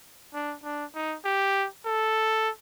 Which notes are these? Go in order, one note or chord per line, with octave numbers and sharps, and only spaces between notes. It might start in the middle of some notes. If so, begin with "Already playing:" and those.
D4
D4
D#4
G4
A4